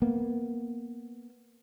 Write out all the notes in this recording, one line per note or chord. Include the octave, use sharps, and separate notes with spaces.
A#3 B3